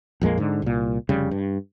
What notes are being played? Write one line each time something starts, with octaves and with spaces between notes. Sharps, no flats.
A#1 F2 G#3 A#3
G#2 D3
C2 A#2
F1 C#3 G3
G2